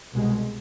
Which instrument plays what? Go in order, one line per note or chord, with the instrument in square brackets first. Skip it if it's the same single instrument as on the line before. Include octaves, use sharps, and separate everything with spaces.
[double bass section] C2 B2 G#3